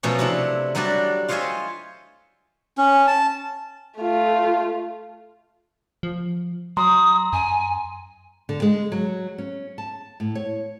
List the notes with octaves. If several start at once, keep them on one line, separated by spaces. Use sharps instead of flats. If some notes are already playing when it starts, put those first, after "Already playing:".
B2 F3 F#3 A3 C#4
C3 D4 E4
F#3 G3 D4 F#4 D5
F4 C5 C#5 D#5 E5 G#5
C#4
A5
A3 F4
F3
F#3 A#5 C6 D#6
F#2 G#5
D3
G#3
F#3
C#4
A5
A2
C#5